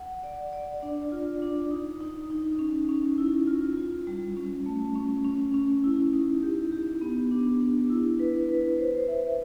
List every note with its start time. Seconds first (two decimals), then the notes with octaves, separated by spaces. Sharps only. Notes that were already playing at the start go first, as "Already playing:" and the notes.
Already playing: F#5
0.23 D5
0.53 D5
0.83 D4
1.12 F4
1.42 D4
1.71 D#4
2.01 D#4
2.30 D#4
2.59 C#4
2.89 C#4
3.18 E4
3.47 F4
3.78 F4
4.07 G3
4.37 C#4
4.66 A3
4.95 C#4
5.24 C#4
5.54 C#4
5.84 E4
6.13 D#4
6.43 G4
6.72 G4
7.01 B3
7.31 D4
7.61 D4
7.90 E4
8.20 B4
8.49 B4
8.78 C5
9.08 E5